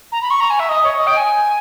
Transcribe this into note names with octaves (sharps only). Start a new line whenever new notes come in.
A#5
B5
C#6
A#5
G#5
E5
D#5
C#5
D#5
G5
G#5